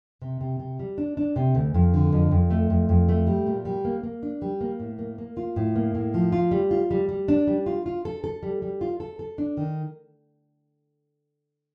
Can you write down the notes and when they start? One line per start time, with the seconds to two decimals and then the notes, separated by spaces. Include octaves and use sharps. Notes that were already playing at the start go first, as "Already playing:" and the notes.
0.22 C3
0.41 C3
0.60 C3
0.79 G3
0.98 D4
1.17 D4
1.36 C3
1.55 D2
1.74 F2
1.94 D3
2.12 F2
2.31 F2
2.50 A3
2.70 F2
2.89 F2
3.09 A3
3.27 G3
3.47 A#2
3.65 G3
3.85 A#3
4.03 A#3
4.23 D4
4.42 G3
4.61 A#3
4.80 A2
4.99 A#3
5.18 A#3
5.37 F4
5.56 A2
5.76 A#3
5.95 A2
6.14 F3
6.32 F4
6.51 G3
6.71 F4
6.91 G3
7.09 G3
7.28 D4
7.47 G3
7.66 F4
7.86 F4
8.05 A4
8.24 A4
8.43 G3
8.62 G3
8.81 F4
9.00 A4
9.19 A4
9.38 D4
9.57 D#3